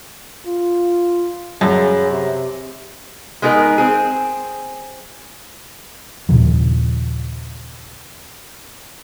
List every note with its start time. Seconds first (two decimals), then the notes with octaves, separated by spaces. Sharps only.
0.47 F4
1.61 F#2 C#3
2.11 C3
3.42 G#3 B3 D#4 G#4 A#4
3.78 C4 G#4
6.29 D#2 A#2 C#3 F3